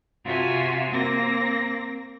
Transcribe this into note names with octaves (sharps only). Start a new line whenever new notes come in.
C3 F4 F#4 E5 G#5
A#3 C4 A#6